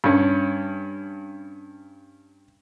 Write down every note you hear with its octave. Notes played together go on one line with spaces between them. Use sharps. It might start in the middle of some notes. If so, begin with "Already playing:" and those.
G2 C#4